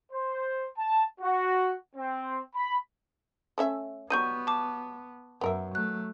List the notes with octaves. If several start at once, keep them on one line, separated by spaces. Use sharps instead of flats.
C5
A5
F#4
C4
B5
A3 C#4 E5
F#3 G3 B3 D#4 C#6 G6 D#7
A5 D6
F#2 B3 A#4 E5
F#3 A3 F#6